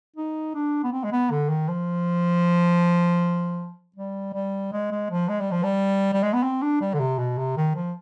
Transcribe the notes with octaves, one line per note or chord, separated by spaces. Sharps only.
D#4
D4
B3
C4
G#3
B3
D3
D#3
F3
G3
G3
G#3
G#3
F3
G#3
G3
F3
G3
G3
G#3
B3
C4
D4
G3
D3
C3
B2
C3
D#3
F3